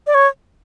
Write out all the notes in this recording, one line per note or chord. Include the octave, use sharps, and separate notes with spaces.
D5
C#5